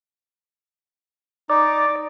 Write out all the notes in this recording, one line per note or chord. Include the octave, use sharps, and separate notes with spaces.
D#4 D5